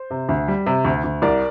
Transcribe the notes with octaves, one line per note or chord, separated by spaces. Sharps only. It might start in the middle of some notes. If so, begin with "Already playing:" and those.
Already playing: C5
C3
D2
G3
C3
D2
D2
C2 A#4 D5